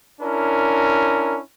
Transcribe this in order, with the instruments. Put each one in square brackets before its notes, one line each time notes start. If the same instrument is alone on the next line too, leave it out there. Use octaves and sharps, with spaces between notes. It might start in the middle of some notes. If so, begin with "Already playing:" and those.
[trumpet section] C#4 D4 E4 A#4